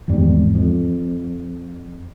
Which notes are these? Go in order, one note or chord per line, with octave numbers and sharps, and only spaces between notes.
G#1 E2 G#2 G3
F2